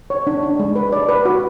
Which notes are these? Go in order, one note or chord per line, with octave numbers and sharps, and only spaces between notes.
C#5
D4
D4
G#3
B4
D5
B4
F#4